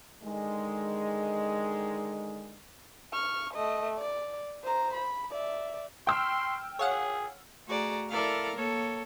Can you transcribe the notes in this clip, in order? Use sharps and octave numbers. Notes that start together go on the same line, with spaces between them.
D3 D#3 G#3
C#6 F6
A3 D#5
D5
C5 A#5
B5
D5 E5
G5 C6 E6 F6
G#4 C#5 F5 F#5
A3 F#4 G#4 D5 A#5
E4 A4 A#4 D5 F5 F6
A#3 A4 C#5